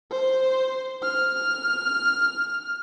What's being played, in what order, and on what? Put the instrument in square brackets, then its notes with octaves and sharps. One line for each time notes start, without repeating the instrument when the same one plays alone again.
[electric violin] C5
F6